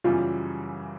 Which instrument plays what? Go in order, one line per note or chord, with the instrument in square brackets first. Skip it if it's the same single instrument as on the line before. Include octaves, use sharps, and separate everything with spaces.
[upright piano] F#2 C#3 E3 G3 [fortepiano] F4